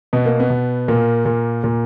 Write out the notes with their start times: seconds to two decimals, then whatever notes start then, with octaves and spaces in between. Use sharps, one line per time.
0.13 B2 B3
0.25 A#3
0.40 B3
0.50 B2
0.88 A#2 A#3
1.25 A#2
1.64 A#2